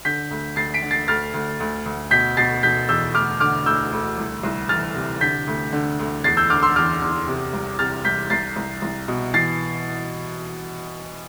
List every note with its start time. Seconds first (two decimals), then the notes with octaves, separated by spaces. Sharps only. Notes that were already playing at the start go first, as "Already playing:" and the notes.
0.05 D3 G6 B6
0.31 D2
0.56 D2 A6 C7
0.74 B6 D7
0.82 D3
0.91 A6 C7
1.08 D2 F6 A6
1.34 D2
1.60 D2
1.86 D2
2.11 B2 G6 B6
2.37 B2 A6 C7
2.63 B2 G6 B6
2.89 E2 E6 G6
3.15 D2 D6 F6
3.40 D3 D6 F6
3.66 D2 E6 G6
3.92 D2
4.18 C2
4.43 C2
4.69 E3 F6 A6
4.95 C3
5.21 D3 G6 B6
5.47 D2
5.73 D3
5.99 D2
6.24 E2 A6 C7
6.37 E6 G6
6.50 D3 D6 F6
6.63 C6 E6
6.76 E2 D6 F6
7.02 E2
7.28 C3
7.53 C2
7.79 C3 F6 A6
8.04 C2 G6 B6
8.30 C2 A6 C7
8.56 C2
8.82 C2
9.08 B2
9.34 E3 A6 C7